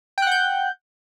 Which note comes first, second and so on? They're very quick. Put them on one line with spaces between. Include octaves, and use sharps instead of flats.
G5 F#6 F#5 G6